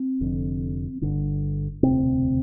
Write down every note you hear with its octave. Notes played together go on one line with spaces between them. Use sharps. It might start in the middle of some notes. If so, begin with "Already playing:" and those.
Already playing: C4
F1 F2 D3
G1 G2 D3
E1 D2 C3 C4